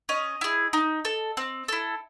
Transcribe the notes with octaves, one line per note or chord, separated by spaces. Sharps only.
C#4 D#5
E4 G#4
D#4
A4
C4
E4 A4